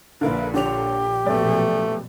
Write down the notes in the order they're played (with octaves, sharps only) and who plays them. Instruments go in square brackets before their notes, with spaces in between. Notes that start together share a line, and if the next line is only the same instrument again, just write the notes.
[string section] A#1 A#2 [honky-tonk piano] D3 A#3 E4 [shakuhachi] B4
[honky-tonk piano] D3 C#5 F7 [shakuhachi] G4
[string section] A#1 B2 F3 [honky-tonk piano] F#2 D5 [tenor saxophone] A3